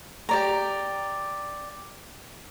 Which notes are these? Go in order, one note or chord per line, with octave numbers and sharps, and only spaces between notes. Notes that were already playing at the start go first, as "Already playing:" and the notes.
G4 D5 A#5